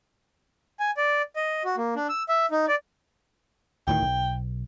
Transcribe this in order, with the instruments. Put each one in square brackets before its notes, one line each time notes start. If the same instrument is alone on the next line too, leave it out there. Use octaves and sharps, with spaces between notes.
[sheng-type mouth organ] G#5
D5
D#5
F#4
A#3
D4
E6
E5
D#4
D5
[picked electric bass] D2 A2 D#3 [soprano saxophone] G5
[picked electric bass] B1